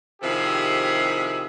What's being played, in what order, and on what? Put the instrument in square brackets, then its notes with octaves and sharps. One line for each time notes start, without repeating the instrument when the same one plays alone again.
[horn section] C3 D#3 F3 E4 G4 G#4